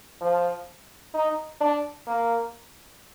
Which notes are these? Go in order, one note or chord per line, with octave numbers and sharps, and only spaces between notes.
F3
D#4
D4
A#3